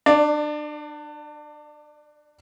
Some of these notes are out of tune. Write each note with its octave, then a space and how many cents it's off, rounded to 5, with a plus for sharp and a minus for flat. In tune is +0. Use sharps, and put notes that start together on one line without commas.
D4 +30 D5 +0